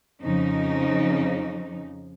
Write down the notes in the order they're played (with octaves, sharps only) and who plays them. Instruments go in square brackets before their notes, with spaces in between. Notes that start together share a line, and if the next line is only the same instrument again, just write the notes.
[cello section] F2 C#3 F3 D#4